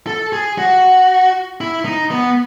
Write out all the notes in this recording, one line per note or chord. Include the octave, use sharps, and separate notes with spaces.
A4
G#4
F#4
E4
D#4
B3